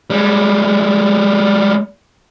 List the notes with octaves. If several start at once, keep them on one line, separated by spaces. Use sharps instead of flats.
G3 G#3